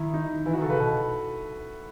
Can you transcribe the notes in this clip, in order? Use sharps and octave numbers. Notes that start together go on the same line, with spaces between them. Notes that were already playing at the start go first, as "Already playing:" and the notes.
Already playing: D#3 E4
D#4
E3 E4
F#4
D#3
A4
C#3
B4
B2